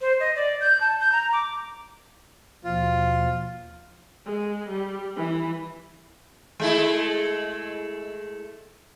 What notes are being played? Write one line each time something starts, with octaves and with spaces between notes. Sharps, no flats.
C5
D#5
D5
G6
A5
G6
A#5
D6
D#2 B2 F3 F4
G#3
G3
E3
G#3 A3 E4